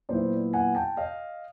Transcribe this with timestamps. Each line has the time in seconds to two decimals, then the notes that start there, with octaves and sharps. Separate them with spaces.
0.09 A#2 F#3 B3 E4 C5 D5
0.53 F#5 G#5
0.75 G5 A5
0.97 D#5 F5